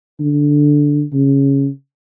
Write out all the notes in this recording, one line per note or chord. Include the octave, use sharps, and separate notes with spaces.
D3
C#3